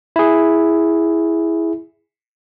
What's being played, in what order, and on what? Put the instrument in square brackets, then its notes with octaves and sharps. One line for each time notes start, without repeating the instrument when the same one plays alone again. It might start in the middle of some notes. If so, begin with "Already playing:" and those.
[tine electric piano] E4 G#4